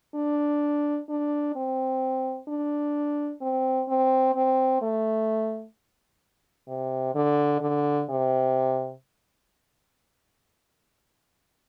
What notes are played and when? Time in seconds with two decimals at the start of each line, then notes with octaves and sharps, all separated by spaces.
0.15 D4
1.09 D4
1.56 C4
2.48 D4
3.42 C4
3.89 C4
4.35 C4
4.82 A3
6.69 C3
7.15 D3
7.61 D3
8.09 C3